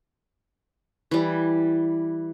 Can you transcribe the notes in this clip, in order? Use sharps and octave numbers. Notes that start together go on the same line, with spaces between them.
E3 G3